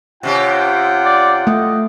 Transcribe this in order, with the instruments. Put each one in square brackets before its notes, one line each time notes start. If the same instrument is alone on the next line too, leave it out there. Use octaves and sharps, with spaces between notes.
[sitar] C3 C#4 G4 [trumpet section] F4 F#5 G5
[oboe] D5
[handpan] A3 [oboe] D#5